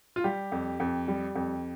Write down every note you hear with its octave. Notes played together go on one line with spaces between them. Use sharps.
F4
G3 G4
F2
F2
G3
F2